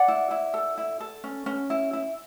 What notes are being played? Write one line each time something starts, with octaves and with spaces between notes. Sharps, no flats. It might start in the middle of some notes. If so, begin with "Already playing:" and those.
Already playing: D5 F#5
E4
E4
A4
E4
A4
C#4
C#4
E4
E4